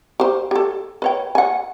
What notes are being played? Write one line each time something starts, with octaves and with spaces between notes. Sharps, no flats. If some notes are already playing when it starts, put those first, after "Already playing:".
G4 C5
G4 A4
B4 C#5 G5
F#5 G#5